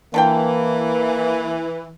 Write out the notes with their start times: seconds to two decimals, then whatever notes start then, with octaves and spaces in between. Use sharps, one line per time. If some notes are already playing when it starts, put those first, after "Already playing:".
0.14 D3 E3 F3 A#3 G5